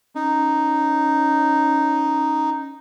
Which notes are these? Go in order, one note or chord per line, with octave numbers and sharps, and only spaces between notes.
C#4 D#4